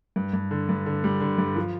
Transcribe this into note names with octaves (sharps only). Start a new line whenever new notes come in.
G2
G2
D3
G2
D3
G3
D3
G2
F3